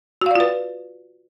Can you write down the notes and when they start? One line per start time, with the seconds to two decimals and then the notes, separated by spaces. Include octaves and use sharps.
0.21 F#4
0.26 F5
0.31 D5
0.35 F4
0.40 B4